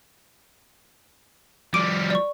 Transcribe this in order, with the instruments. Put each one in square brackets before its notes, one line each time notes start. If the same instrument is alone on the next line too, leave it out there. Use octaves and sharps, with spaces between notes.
[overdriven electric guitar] F3 G3 [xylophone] D6 D7 D#7
[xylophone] D5 C#6